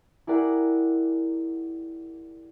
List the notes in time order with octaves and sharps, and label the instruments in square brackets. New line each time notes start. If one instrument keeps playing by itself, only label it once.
[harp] E4 G4 G#4 A#4 D5 F#5